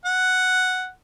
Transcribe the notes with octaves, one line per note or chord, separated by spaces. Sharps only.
F#5